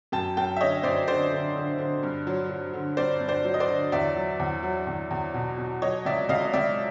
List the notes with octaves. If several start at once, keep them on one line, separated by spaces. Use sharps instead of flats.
F#2 G5 A5
F#2 G5 A5
E5
D3 C#5 D#5
F#2 C5 D5
D3 C5 D5
D3
D3
D3
G2
F#3
F#3
D3
G2 C5 D5
G2
C5 D5
F#3
D#5
C5 D5
D3
E2 D5 E5
F#3
E2
F#3
E2
E2
B2
B2
F#3 C#5 D#5
C#2 D5 E5
C#2 D#5 F5
D#5
C#2 D5 E5